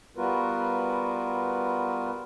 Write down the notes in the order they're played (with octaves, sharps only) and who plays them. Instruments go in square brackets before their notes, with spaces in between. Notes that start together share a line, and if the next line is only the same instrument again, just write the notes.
[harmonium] G3 B3 F4 F#4 A#4 B4